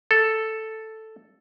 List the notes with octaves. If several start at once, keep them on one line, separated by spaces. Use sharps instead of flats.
A4